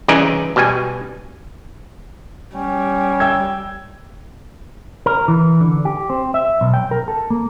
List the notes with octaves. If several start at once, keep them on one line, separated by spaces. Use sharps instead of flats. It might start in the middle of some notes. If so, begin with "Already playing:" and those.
C2 C#3 E3 D#4 D5 G#5
B2 G3 G#5
G3 C#4
G5 E6 G#6
A#4
E3
D3
G4
C4
E5
B1
G5
A#4
A4
A#3